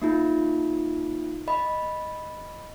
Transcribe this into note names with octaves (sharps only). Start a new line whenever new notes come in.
A#3 D#4 F4
D#5 B5